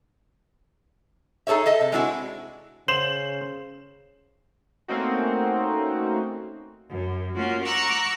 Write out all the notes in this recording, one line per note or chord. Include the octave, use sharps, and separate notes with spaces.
D#4 G#4 A4 C#5 E5
A4 D#5 E5
C3
G#3 C4 D4 E4 F#4 G#4
C#3 C5 E7 F#7
A3 A#3 C4 C#4 D#4 F#4
F#2
A#3 C#4 F4 F#4
F#5 A#5 C#6 D6 E6 F#6